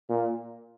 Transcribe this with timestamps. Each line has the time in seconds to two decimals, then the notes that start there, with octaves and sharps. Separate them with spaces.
0.09 A#2